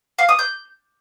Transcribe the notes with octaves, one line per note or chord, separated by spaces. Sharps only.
F5
D#6
G6